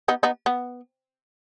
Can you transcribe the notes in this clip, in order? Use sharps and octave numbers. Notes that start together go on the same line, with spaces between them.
B3 D#4
B3 D#4
B3